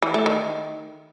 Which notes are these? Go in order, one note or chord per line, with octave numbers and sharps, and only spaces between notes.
E3
A3
D#3